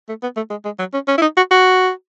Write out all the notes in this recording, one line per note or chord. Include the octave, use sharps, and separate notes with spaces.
A3
B3
A3
G#3
G#3
F#3
C#4
C#4
E4
D#4
F#4
F#4